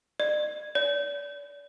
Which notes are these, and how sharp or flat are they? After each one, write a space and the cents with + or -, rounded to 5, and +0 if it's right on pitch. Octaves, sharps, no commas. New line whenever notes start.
D5 +45
D5 -40